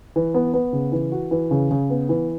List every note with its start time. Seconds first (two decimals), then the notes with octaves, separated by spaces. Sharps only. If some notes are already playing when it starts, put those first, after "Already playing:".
0.16 E3
0.34 B3
0.54 B3
0.73 C#3
0.92 E3
1.12 F#4
1.31 E3
1.51 C#3
1.71 C#3
1.90 B3
2.09 E3